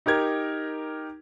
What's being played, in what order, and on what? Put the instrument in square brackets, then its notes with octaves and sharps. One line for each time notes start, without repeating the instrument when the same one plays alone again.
[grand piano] D#4 G4 A#4 G#6